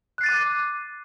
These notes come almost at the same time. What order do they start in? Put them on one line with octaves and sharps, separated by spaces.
F#6 C7 A6 D#7 D6